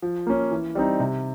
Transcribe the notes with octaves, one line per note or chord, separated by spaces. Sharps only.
F3
A#3 C#4
E3
G3 C4 D#4
C3